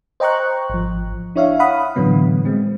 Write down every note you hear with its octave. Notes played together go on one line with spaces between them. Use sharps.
C5 D#5 G5 A#5 C#6 F#6
G#1 F3
D4 E4 C#5 E5 F5
F5 F#5 B5 D#6
A2 D3 E3 F#3 B3
G#3 C4